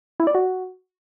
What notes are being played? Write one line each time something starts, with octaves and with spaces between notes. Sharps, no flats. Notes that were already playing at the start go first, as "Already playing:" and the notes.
E4
D5
F#4